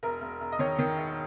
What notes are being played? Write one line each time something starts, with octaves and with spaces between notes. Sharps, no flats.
E1 A#4
E1
E1
D#5
D#3 C#5
D#3
E1